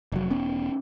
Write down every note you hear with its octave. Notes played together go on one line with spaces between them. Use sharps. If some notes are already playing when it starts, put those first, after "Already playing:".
F1 F#3
E1 B3 C#4